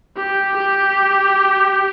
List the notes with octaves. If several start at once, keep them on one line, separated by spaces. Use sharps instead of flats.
G4
G4